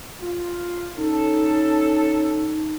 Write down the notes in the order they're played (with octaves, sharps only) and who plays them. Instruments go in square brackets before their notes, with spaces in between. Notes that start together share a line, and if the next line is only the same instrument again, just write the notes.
[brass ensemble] F4
[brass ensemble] C#4 A4 [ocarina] D#4